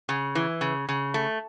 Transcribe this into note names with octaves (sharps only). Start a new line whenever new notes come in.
C#3
E3
C#3
C#3
A3